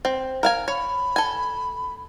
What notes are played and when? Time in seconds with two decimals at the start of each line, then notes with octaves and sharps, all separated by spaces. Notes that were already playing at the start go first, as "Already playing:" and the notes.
0.05 C4
0.43 A#4 F5 G#5
0.68 C#5 B5
1.16 A4 G#5